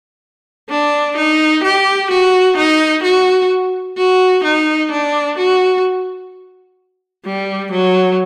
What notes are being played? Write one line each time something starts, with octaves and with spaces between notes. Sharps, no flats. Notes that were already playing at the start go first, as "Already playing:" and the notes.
D4
D#4
G4
F#4
D#4
F#4
F#4
D#4
D4
F#4
G3
F#3